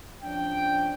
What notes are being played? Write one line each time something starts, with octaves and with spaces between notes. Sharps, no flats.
F3 C#4 D4 G5